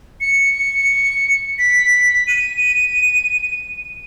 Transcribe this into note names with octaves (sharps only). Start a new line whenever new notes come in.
C#7
B6
D#7